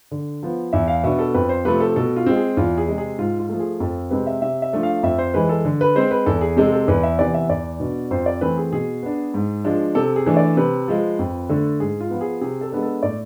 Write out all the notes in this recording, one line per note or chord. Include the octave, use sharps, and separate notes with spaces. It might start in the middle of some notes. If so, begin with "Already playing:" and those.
D3
F3 B3
E2 E5
F5
B2 B3 D4 E5
A4
F2 B4
C5
C3 F3 A3 B4
A4
B2 A4
F4
G#3 C4
G#4
E2 F4
G#4
C3 G#3
G#4
G#2 F4
F4
F3 A3
G#4
F2 A4
C3 G#3 C4 B4
E5
C3 E5
E5
F3 A3 D4
F5
F2 E5
C5
E3 G#3 B4
A4
D3
B4
G#3 C4 C5
B4
E2 A4
G#4
C3 G#3 C4 A4
A4
E2 B4
E5
C3 E3 B3 D5
E5
E2 D5
B2 B3 D4
F2 C5
D5
E3 A3 C4 B4
G#4
B2 G#4
B3 D4
G#2
F3 G#3 D4
C3 A4
G#4
E3 A3 D4
D5
C3 B4
F3 G#3
F2
D3 A3 D4
G#2 G#4
F4
F3 B3
G#4
C3 G#4
A4
G#3 B3 D4
A4
A2 D5